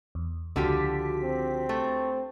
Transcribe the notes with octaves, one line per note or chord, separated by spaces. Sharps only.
E2
C#2 D3 F3 F#4 G4 B6
C4
A3